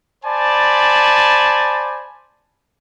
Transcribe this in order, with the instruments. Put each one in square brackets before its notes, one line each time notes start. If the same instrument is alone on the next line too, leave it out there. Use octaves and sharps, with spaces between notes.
[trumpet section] C5 D5 G#5 A5 B5